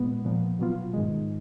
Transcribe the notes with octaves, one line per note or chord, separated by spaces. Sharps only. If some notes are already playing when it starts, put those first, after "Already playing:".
Already playing: A#2 G#3 B3
A#2 F3 B3
B2 F#3 B3 F4
G#2 D#3 G#3